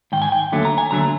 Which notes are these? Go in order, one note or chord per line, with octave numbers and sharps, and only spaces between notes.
G#2 D#3 G5
G#5
G5
D#2 D3 F#3 A3
A#5
G#5
D#2 D3 F#3 A3 A#5